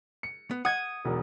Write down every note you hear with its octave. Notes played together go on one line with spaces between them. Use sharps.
C#7
B3
F#5 D#6 G#6
E1 B1 A#4